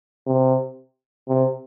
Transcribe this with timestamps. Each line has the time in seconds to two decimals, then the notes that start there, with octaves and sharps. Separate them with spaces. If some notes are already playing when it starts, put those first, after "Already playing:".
0.27 C3
1.29 C3